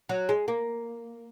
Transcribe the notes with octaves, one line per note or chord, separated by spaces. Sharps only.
F#3
G#3
A#3